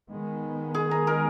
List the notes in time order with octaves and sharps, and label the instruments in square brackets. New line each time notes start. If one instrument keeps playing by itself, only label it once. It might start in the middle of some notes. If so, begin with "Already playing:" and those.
[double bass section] D#3 G#3 B3
[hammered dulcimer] G#4
A#4
A#4